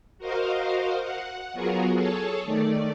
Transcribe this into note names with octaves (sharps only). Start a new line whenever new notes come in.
F#4 A#4 C5 D#5 F5
F#5
F#3 B3 F4 F#4 G#4 A#4
G#4 A4 C#5 A5
D#3 A3 D5